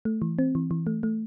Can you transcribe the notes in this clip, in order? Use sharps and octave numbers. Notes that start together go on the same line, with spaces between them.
A3
E3
C4
E3
E3
A3
A3